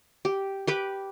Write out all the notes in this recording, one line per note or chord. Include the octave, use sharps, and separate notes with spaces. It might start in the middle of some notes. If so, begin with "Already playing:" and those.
G4
G4 B4 D6